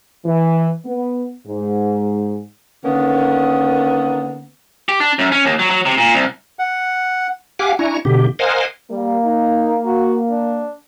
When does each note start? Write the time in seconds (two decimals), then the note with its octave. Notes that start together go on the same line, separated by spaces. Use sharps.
0.25 E3
0.85 B3
1.46 G#2
2.84 D3 D#3 A#3 B3 C#4
4.89 G4
5.00 D4
5.19 F#2
5.32 C#4
5.44 D#2
5.59 F#3
5.71 F#3
5.86 C3
5.98 A#2
6.14 C2
6.59 F#5
7.59 G4 F5 F#5 G#5 D6
7.79 D4 E4 G#5 A#5 C#6
8.05 B2 D3 G4
8.39 A#4 C5 D#5 F5 F#5 G#5
8.91 G3 A#3
9.24 D#4
9.86 F#4
10.30 D4